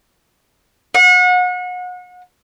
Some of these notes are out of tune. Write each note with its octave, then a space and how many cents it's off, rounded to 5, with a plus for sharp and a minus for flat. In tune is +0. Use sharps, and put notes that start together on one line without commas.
F#5 -35